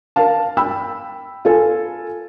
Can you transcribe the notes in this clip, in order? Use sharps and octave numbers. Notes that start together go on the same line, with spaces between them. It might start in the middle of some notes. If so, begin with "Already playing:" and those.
A#4 F5 A5
G5 B5 E6
F4 A4 G#5